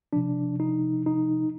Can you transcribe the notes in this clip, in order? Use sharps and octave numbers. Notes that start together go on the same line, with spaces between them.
C3 F3 D4
D#4
D#4